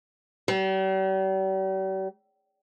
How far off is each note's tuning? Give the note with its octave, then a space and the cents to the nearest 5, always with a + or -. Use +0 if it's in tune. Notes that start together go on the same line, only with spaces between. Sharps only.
G3 -45